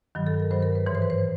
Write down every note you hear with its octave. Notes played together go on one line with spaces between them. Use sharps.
G2 D#3 F#3
A4
A#4
G2 D#3 F#3 C5
A#4
B4
G#2 E3 C#5
C5
B4
C5